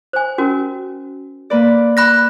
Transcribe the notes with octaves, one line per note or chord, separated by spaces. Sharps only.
C5 G#5
C#4 F#4 A#4
A#3 B4 D5
B5 F#6 A#6